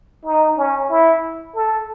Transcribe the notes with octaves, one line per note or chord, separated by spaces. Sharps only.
D#4
C#4
E4
A4